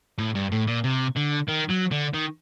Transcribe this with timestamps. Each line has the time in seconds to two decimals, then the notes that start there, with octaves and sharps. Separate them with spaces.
0.19 A2
0.35 G2
0.52 A2
0.67 A#2
0.84 C3
1.17 D3
1.49 D#3
1.70 F#3
1.92 D3
2.14 D#3